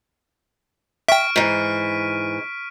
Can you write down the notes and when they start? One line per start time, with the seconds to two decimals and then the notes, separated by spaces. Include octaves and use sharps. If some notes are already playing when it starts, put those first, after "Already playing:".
1.08 E5 G5 C#6 F6 D7
1.36 G#2 E3 C#6 B6 D#7